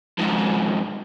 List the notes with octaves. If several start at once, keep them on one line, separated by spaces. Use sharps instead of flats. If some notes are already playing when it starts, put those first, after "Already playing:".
F2 G#2